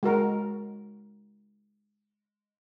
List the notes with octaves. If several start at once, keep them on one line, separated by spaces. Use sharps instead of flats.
G#3 F#4 A#4